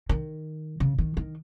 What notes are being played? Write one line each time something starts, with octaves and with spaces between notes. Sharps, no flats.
D#3
C#3
D#3
D#3